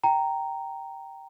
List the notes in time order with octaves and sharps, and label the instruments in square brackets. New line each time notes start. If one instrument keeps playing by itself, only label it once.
[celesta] G5 A#5